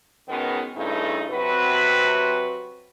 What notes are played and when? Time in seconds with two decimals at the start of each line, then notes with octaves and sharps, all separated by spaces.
0.28 B2 D#3 F#3 G#3 B3 C#4
0.74 G2 C#3 A3 D#4 E4
1.30 C3 F#3 C4 F#4 B4